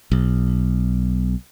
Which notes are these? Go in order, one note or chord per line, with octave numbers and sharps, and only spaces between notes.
B1